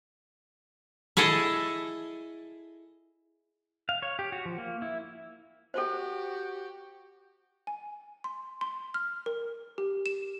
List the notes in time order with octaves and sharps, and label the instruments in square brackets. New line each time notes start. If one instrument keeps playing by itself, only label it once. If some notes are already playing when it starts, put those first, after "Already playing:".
[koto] E4 G#4 A4 D#5
[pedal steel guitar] F5
C#5
G4
F#4
F3
A#3
E4
[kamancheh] F#4 G4 [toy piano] A4 C5
[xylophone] G#5
C6
C6
F6
A#4
G4
E7